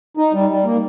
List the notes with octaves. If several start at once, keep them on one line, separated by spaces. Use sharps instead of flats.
D#4
G3
G3
A#3